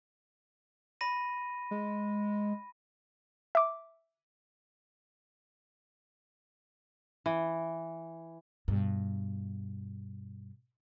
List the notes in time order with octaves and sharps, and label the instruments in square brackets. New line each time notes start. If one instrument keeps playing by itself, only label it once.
[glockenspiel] B5 A#6 D#7
[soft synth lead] G#3
[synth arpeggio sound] E5 D6
[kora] E3
[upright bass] G2 B2